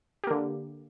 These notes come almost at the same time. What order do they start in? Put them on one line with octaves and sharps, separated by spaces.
G4 A#3 D3